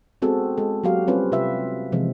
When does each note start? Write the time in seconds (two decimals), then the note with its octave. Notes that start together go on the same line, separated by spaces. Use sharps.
0.22 G#3 B3 C4 F#4 G#4 A4
0.58 G#3 A4
0.84 F#3 A#3 F#4 G4 F5
1.07 G3 C4 C#4 F4 B4
1.32 C3 F4 B4 E5
1.92 C3 E3 F3 G#3 C4